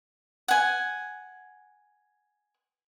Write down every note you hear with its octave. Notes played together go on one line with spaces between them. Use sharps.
F#5 G#5